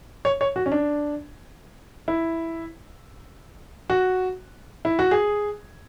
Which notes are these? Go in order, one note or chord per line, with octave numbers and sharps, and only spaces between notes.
C#5
C#5
F#4
C#4
D4
E4
F#4
E4
F#4
G#4